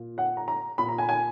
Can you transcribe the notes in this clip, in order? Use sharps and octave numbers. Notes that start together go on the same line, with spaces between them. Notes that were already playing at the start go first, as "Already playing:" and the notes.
Already playing: A#2
F#5
A#5
A#5
A#2 B5
A#5
G#5
G#5